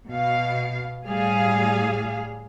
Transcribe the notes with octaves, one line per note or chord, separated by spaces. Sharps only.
B2 F5
A2 G3 G#4 F5